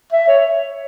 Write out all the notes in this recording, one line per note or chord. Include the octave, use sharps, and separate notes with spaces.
E5
C#5